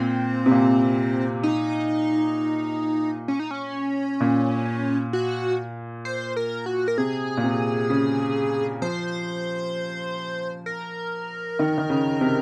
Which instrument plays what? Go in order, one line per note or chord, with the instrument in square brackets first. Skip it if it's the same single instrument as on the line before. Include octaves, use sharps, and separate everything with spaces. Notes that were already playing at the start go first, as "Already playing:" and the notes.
Already playing: [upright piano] A#2 [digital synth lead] C4
[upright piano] C3
A#2
[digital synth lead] D#4
C#4
D#4
C#4
[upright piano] A#2
[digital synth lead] F#4
C5
A#4
F#4
A#4
[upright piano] C3 [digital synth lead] G#4
[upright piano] A#2
C3
C#3
[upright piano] F3 [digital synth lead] C5
[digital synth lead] A#4
[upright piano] D#3
D#3
C#3
C3